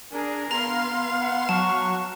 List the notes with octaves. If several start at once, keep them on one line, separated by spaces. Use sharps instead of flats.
D4 G#4 A#4
B3 F5 A#5 C6
F#5
F#3 A5 C#6